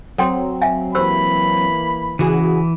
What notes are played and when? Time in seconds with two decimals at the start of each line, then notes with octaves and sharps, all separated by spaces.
0.18 F#3 C4 A4 G5 C6
0.62 E5 F5 G#5
0.95 E3 A#3 G4 C5 B5 E6
2.19 C#3 E3 F#4 G#4